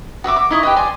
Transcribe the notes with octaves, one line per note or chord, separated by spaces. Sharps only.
F#4 C#5 E5 D6
D6
D#4 E4 D#5 C#6
G4 B4 D#5
D5 G#5 C6